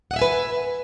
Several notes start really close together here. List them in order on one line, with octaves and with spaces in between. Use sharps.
F#5 D#5 E5 G#5 B4